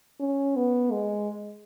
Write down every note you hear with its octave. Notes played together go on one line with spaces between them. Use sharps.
C#4
B3
G#3